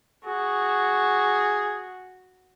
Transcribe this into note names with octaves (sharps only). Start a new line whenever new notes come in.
F#4 G#4